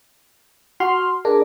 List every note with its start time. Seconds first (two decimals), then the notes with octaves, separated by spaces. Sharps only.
0.80 F#4 C6 F6
1.25 D4 G#4 A#4 D5